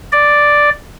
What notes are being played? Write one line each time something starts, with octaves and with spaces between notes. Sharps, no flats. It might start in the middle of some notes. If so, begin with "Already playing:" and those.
D5